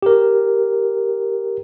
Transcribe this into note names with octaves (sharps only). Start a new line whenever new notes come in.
G4 A#4